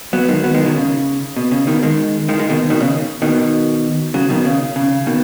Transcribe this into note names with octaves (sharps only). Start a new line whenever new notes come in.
F#3 B3
D#3 G#3
F#3 B3
D#3 G#3
B2 D#3
C#3
B2
C#3
B2 D#3
D#3 G#3
D#3 G#3
D#3 G#3
B2 D#3
B2 D#3
C#3
B2 D#3
C#3 F#3
B2 D#3
C#3
C#3
B2 D#3